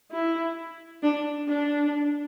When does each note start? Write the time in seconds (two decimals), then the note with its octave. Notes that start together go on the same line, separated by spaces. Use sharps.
0.12 E4
1.03 D4
1.48 D4